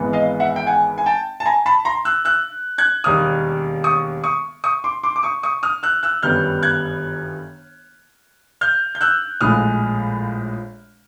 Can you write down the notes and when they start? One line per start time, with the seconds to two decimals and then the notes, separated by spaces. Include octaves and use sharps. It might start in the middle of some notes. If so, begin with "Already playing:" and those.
Already playing: G#1 G#2 E3 G#3 B3
0.13 D#5 F5
0.40 E5 F#5
0.56 G5
0.66 F#5 G#5
0.98 G#5
1.06 G5 A5
1.40 A5
1.45 G#5 A#5
1.66 A5 B5
1.85 A#5 C6
2.05 E6 F#6
2.25 E6 F#6
2.78 F#6 G#6
3.04 E1 D#2 D#3 G3 A#3 D#6 F6
3.84 C#6 D#6
4.24 C#6 D#6
4.64 C#6 D#6
4.84 C6 D6
5.03 C6 D6
5.16 D6
5.23 C#6 D#6
5.43 C#6 D#6
5.63 D#6 F6
5.83 E6 F#6
6.03 E6 F#6
6.22 G1 F#2 D#3 G3 B3 F6 G6
6.63 F#6 G#6
8.61 F6 G6
8.95 G6
9.01 E6 F#6
9.41 A#1 A2 F3 G#3 D#6 F6